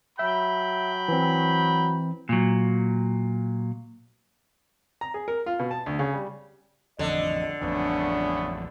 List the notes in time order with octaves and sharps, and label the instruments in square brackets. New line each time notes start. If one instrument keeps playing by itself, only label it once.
[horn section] F#3 G5 B5 [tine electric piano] E5
[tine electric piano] E3 C4
[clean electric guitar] A#2 F#3
[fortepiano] A#5
G#4
A#4
F4
B2
A5
D2
C#3
G3
[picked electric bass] A1 F2 [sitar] D3 [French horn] D#5
[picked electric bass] A1 F2 [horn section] C#3 A3 B3 [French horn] D4